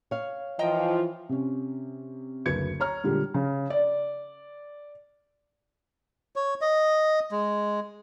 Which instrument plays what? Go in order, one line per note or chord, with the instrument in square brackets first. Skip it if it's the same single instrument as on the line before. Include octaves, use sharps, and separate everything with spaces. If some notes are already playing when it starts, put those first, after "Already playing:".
[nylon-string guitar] C#5 F5
[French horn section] E3 F3 [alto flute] F4 [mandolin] D#5 G5 A#5
[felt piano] C3 C#4
F#1 D2 B4 G#6 C#7
C#5 A#5 F6
A#2 D3 G3 G#3
C#3
D5
[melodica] C#5
D#5
G#3